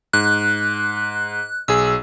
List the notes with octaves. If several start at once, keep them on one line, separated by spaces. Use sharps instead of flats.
G#2 F#6
B1 G#4 E6